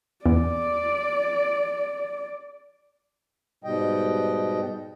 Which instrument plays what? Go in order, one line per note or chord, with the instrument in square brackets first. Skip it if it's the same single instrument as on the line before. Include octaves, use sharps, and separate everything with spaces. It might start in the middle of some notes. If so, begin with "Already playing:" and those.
[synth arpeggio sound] E2 [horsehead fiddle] D5
[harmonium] G#2 B2 G3 D#5 G5